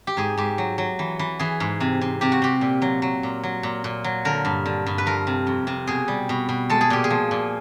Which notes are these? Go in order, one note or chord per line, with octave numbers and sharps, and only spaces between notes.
G4
G#2 G#4
G#2 G4
F#3
F#3
E3
E3
E3 G#4
G#2
C3
C3
C3 G4
F#4
C3 G4
A#2
F#3
F#3
A#2
F#3
A#2
A#2
F#3
D3 A#4
G2
D3
G2
B4
F3 A#4
C3
F2
C3
B2 G#4
G3
B2
B2
G#3 A4
G#4
A#2 G4
G#4
F3
A#2